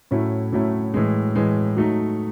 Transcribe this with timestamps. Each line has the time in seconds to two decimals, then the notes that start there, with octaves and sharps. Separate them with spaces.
0.11 A2 F#3 A3 C#4 E4
0.52 A2 F#3 A3 C#4 E4
0.94 A2 E3 G#3
1.35 A2 E3 G#3
1.76 F#3 A3 D#4